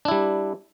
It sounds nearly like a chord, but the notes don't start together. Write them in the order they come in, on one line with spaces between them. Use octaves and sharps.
D4 E4 G3